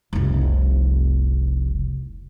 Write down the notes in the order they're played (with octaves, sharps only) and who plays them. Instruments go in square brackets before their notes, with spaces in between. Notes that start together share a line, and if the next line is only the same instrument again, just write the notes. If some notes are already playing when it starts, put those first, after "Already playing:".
[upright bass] F1 C2